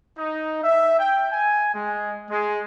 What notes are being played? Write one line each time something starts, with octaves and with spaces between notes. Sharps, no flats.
D#4
E5
G5
G#5
G#3
G#3